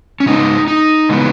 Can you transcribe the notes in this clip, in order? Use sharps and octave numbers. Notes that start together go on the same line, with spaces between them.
C#4
C#3 G#3 B3 D#4
D#4
C#3 E3 G#3 B3